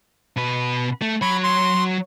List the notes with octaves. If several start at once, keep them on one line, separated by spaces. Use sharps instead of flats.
B2 B4
A3
F#3 C#5 B5
C6